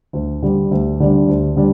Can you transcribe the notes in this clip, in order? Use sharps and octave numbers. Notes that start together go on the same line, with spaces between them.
D2
D3 G3 D4
D2
D3 G3 D4
D2
D3 G3 D4